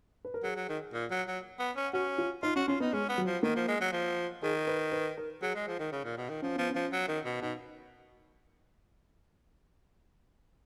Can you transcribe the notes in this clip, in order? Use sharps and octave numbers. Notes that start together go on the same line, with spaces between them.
B4
A#4
F#3 G#4
F#3
D#3
A#2
F#3
F#3
B3
C#4
C#4 F#4
F4
D#4 F4
C#4 F#4
C#4 F4
B3 D#4
G#3 C#4
B3
F#3
F3
D#3 A#3
F3
G#3
F#3
F3
D#3 G#4
B4
B4
A#4
F#3 G#4
G#3
F3
D#3
C#3
A#2
B2
D#3
F3 C#4
F3 B3
C#4
F3
F#3
D#3
B2
B2 D#4